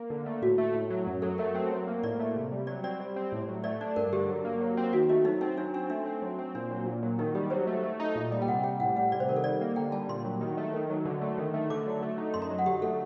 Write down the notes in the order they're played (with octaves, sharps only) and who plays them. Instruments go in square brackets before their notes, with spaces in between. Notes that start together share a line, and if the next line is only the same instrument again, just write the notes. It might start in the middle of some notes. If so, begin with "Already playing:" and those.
Already playing: [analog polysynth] A#3
D3
A3
[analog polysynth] A2 [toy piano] F#4
[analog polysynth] A3
A2
F#3
F#2
[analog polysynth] F#3 [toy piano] A4
[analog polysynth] A3 [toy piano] A#4
[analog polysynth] C4
F#3
A#3
[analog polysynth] A2 [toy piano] D5
[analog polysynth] A3
C3
G3
[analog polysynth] F#3 [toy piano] D5
[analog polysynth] C4 [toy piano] D5
[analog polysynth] G3
C4
A2
F#3
[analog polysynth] A3 [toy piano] D5
[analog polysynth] D4 [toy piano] D5
[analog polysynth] G2 [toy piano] A#4
[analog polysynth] D3 [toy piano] G4
[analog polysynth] F#3
A#3
F#3
C4
[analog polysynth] D#3 [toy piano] F#4
[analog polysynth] A3 [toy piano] F#4
[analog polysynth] F#3 [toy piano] D#4
[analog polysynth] C4 [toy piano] D#4
[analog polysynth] F#3 [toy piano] D4
[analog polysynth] C4 [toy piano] D4
[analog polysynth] A3 [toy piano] D4
[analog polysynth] C4
F#3
C4
[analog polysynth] A#2 [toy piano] D4
[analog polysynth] F#3
A#2
F#3
[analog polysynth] D#3 [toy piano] D#4
[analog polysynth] G3 [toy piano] G4
[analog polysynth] F#3 [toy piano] C5
[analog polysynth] A3
A3
D#4
A#2
[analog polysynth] G3 [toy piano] D#5
[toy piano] G5
[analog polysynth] C3 [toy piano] F#5
[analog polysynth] G3 [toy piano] G5
[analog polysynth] A2 [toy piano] F#5
[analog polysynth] G3 [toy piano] F#5
[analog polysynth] C3 [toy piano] D5
[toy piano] C5
[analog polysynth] D#3 [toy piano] A#4
[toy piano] A4
[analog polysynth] G3 [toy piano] D5
[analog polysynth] A#3
[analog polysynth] D3 [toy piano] G5
[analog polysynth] G3 [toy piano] A5
[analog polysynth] A#2 [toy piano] C6
[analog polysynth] F#3
D#3
A3
D#3
F#3
D3
A3
D#3
A3
[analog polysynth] D3 [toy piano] D6
[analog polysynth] F#3
A3
D#4
[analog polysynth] F#2 [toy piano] C6
[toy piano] A#5
[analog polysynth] F#3
[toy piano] F#5
[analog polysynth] D3 [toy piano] G4
[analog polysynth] A3 [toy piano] A4